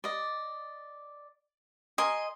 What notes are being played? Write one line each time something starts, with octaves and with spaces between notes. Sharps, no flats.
D5 D#5
A#4 D#5 G#5 C6